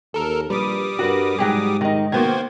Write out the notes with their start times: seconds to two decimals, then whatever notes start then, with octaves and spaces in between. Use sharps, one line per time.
0.14 D#2 A4 A#4
0.50 A#1 G3 B4 D6 D#6
0.99 G2 F#4 A#4 B4
1.38 G#2 F#3 G4 G#4
1.81 D#3 D#4
2.12 D#3 A#3 B3 F#4 C5 G#6